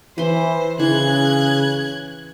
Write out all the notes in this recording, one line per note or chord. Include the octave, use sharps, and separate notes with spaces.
E3 B4 C5 C6
C#3 E3 F#6 G#6